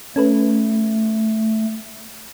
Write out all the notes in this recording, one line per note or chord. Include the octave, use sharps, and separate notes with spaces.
A3 C#4 A4 B4